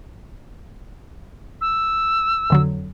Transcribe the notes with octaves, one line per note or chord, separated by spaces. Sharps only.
E6
F2 D3 F#3